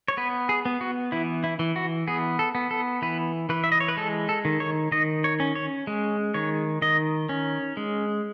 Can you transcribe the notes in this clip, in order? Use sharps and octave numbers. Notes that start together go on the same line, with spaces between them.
C#5
B3 B4
G#4
B3
F#4
E3 E4
E4
E3
F#4
B3 G#4
A4
B3
A4
E3 B4
E3 B4
E5
D#5
C#5
B4
G#3 A4
A4
D#3
C#5
D#3 D#5
C#5
C#4
C#5
G#3
D#3 C#5
D#3 D#5
C#4
G#3